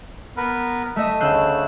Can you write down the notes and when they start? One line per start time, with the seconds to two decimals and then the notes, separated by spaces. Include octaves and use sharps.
0.37 B3 A#4 B4
0.96 A3 D#5 E5
1.20 D2 C#3 E6 F#6 G6 C7